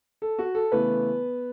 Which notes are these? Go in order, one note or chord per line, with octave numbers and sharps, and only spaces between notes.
A4
F#4
A4
C#3 E3 A3 B3 B4